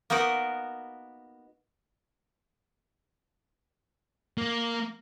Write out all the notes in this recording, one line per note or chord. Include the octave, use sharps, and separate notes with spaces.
A#3 B3 D#4 F#4 A#4
A#3